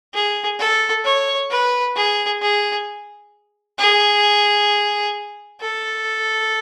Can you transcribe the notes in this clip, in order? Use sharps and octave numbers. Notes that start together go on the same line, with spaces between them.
G#4
A4
C#5
B4
G#4
G#4
G#4
A4